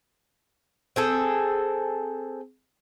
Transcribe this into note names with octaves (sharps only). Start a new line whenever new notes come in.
C4 G#4 A4